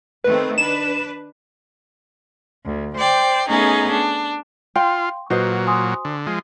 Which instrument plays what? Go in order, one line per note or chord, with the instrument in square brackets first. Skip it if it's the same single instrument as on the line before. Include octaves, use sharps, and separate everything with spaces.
[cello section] D#3 A3 C4 [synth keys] B4
[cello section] D4 B4 [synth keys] E7
[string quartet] D2
C5 D5 G5
A3 B3 C#4 D#4 G#4
D4
[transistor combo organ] F4 [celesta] F5 C6 [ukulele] G5
[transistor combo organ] A#2 F#3 [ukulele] F#4 C5 D#5 [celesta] B4
[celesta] G#5 C6 D#6
[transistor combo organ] D3
F3 G#3